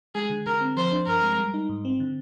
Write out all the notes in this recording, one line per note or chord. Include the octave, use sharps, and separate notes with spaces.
G#3 G#4
D3
D3 A#4
C4
F3 C5
D4
G2 A#4
G#3
G3
D#4
G#2
C4
D3